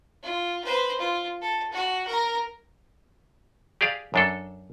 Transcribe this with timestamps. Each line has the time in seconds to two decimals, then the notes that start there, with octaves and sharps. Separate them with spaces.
0.23 F4
0.64 B4 C5
0.99 F4
1.41 A4
1.72 F#4
2.07 A#4 A#5
3.81 G4 G#4 D5 F5
4.14 F#2 D4 A4